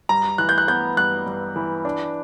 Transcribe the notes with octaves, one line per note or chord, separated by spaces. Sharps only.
G2 A#5
E3 F#6
G6
F#6
B3 G6
G2 F#6
G2
E3
D4